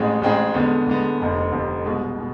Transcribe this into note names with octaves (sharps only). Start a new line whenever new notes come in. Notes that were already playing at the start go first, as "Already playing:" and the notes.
Already playing: A1 A2 G#3 C4 G#4
A1 A2 G#3 C4 G#4
E2 D3 G#3 B3
E2 D3 G#3 B3
F1 F2 D3
F1 F2 D3
C2 B2 G#3
B2